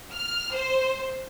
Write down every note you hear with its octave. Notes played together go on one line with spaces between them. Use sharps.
F6
C5